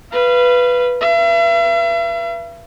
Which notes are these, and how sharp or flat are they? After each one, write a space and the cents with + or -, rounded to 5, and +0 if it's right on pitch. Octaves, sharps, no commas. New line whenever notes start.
B4 +0 F5 -25
B4 -35 E5 +45